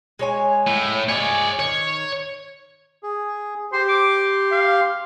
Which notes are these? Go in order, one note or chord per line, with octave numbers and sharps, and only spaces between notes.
G#3 C#5 G#5
A2
G#3 F4 G#4 C#5 D5
D#3 C#5
G#4
G4 C5 C6
D6
F5